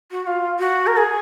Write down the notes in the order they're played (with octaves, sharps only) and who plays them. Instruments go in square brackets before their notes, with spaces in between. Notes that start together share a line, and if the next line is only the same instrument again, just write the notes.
[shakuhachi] F#4
F#4
F4
F#4
A#4
G#4